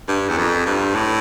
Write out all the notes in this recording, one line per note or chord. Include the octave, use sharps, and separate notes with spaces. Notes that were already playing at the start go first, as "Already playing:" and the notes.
G2
E2
F2
G2
A2